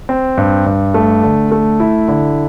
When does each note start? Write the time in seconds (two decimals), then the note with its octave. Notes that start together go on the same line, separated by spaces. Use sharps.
0.09 C4
0.38 G2
0.66 G2
0.94 A3
1.23 D3
1.52 A3
1.80 E4
2.08 D3